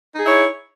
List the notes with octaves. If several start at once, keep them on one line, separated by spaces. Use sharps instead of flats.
D#4 E4 G#4 C#5